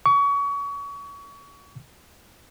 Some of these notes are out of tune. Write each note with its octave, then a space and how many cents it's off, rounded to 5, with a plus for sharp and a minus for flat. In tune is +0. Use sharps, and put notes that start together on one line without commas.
C#6 +30